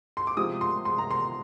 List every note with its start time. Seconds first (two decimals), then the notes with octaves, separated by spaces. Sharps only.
0.17 C6
0.27 D6
0.37 C3 F3 G#3 D#6
0.61 C6
0.85 C6
0.98 A#5
1.11 C6